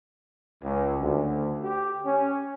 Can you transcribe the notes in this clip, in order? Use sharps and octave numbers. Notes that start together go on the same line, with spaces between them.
C#2
D2
G4
C#4